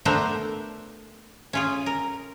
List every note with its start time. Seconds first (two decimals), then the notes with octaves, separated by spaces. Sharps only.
0.05 A3 B3 D4 A#4 C5 E5
1.53 C#4 F4 G#4
1.86 A#4